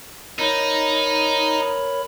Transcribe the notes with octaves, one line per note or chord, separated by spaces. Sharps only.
D#4 A#4 C#5 B5